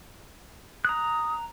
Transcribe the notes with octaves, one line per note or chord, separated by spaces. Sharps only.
A#5 D#6 F#6